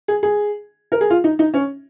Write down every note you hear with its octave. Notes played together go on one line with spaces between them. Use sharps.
G#4
G#4
A#4
G#4
F4
D#4
D#4
C#4